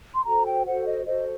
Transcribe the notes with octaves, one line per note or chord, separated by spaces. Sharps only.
C6
F#4 A4 C5 A#5
G5
F#4 A4 C5 F#5
D#5
F#4 A4 C5 D#5